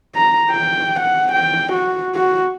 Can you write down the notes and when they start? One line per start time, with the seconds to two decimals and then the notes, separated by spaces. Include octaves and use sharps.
0.15 A#5
0.51 G5
1.00 F#5
1.33 G5
1.73 F#4
2.15 F#4